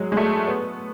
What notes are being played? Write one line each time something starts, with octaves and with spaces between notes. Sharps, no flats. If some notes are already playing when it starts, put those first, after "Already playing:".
Already playing: F#3 G#3
G#3
A3
B3